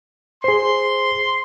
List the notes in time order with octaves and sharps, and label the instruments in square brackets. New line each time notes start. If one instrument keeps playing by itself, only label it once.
[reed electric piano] G#4 C5 [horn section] C6